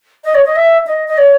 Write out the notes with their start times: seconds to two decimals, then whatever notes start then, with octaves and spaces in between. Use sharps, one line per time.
0.24 D#5
0.35 C#5
0.45 D#5
0.56 E5
0.87 D#5
1.08 D#5
1.18 C#5